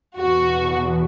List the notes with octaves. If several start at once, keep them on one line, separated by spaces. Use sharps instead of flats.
E2 B2 F#4